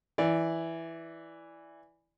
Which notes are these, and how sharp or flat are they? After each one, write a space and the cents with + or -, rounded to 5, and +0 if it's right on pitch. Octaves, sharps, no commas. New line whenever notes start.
E3 +0 D5 +0